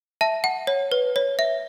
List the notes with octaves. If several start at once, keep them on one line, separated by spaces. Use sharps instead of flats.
E5 A5
F#5
C#5
B4
C#5
E5